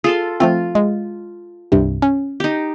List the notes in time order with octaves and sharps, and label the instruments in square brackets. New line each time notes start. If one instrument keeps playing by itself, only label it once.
[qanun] F4 A4 C6 [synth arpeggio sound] G#4
[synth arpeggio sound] F3 A3 C4 [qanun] F4
[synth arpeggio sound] G#3
C2 G2 C3
C#4
[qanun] D#4 G4